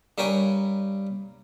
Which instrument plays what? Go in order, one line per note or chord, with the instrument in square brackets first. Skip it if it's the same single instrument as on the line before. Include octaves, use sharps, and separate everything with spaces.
[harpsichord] G2 A#4 B4 C#5 G5 G#5